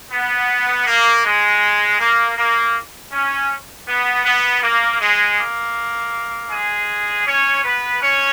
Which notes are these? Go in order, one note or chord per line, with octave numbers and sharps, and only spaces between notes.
B3
A#3
G#3
A#3
A#3
C#4
B3
B3
A#3
G#3
A#3
G#3 G#4
C#4 C#5
B3 B4
C#4 C#5